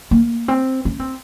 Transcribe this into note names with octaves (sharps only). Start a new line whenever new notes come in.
A#3
C4
C#4
C4